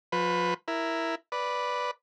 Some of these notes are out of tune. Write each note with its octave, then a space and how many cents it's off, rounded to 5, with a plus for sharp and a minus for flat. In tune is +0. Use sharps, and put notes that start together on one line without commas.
F3 +35 B4 +5
E4 +0 A#4 +0
B4 -5 D5 +0